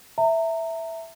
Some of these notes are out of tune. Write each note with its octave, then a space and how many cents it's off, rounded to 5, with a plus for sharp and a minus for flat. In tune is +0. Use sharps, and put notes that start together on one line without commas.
E5 +0 A#5 -30